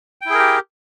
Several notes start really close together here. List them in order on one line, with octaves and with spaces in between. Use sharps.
G5 E4 G#4 A#4 G4